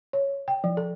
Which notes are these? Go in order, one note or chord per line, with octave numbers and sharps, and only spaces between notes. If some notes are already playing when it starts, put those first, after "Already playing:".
C#5
G5
F3
A4